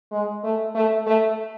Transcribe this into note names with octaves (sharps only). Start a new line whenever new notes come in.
G#3
A3
A3
A3